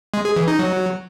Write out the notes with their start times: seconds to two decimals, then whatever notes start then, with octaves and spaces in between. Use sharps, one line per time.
0.14 G#3
0.25 G#4
0.36 E3
0.48 D#4
0.59 F#3